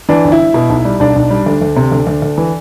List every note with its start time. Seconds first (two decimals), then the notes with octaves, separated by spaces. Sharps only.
0.09 E3 D4
0.24 G1
0.32 E4
0.40 G2
0.54 B2
0.70 B1
0.85 G3
1.00 B1 D4
1.16 B1
1.31 G3
1.46 D2
1.62 D2
1.76 C3
1.92 D2
2.07 D2
2.22 D2
2.38 E3